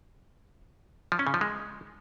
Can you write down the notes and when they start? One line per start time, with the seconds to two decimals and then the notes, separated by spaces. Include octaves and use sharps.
1.12 F3
1.19 C#4
1.27 C#3
1.34 F3
1.41 G#3